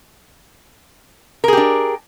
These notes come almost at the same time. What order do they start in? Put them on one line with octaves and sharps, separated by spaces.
A#4 G#4 G4 D4